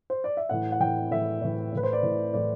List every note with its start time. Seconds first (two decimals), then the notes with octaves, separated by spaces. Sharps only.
0.10 C5
0.24 D5
0.37 E5
0.49 A2 E3 F#5
0.72 F#5
0.80 A2 E3 G5
1.11 A2 E3 E5
1.42 A2 E3
1.72 A2 E3 B4
1.83 C5
1.93 D5
2.03 A2 E3
2.33 A2 E3 D5